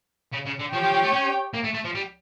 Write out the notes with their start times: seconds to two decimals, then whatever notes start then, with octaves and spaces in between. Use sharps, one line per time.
0.32 C#3
0.45 C#3
0.59 D3
0.73 F3 G5
0.75 G4 C#5
0.83 F3
0.93 F3
1.03 A3
1.13 C#4
1.54 A#3
1.64 A3
1.74 A3
1.85 F3
1.95 G3